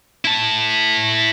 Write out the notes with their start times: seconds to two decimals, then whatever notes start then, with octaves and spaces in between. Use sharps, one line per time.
0.25 E4 A5